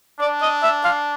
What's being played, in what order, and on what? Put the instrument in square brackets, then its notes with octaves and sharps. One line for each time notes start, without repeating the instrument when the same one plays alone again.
[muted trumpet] D4 [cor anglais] D5
[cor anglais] D#5
E5
F5